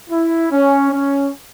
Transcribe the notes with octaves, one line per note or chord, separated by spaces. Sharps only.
E4
C#4
C#4